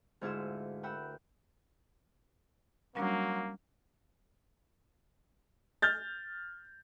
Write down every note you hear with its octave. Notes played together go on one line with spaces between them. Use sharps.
D2 G#2 E4 F4 G#4 E6
A#4 B4 F#5 G5 E6
F#3 G3 A#3 C#4 D4
F6 G6 A6